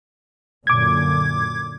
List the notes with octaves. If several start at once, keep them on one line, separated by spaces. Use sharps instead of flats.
F#2 A#2 D3 D6 G#6